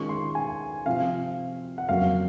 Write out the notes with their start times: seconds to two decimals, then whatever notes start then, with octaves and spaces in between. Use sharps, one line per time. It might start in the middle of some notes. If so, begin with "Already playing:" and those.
Already playing: D#3 G#3 C#4 F4 C#6
0.09 C6
0.35 G#5
0.86 C3 F3 C4 F4 F5
1.78 F#5
1.89 F2 C#3 F#3 A#3 F5